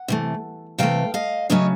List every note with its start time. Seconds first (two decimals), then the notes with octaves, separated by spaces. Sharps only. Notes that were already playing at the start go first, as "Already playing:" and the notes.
Already playing: F#5
0.08 C3 E3 A3
0.78 C3 E3 A3 F5 G5
1.14 D#5 F5
1.50 C#3 F#3 A3 C#4 C#5 D#5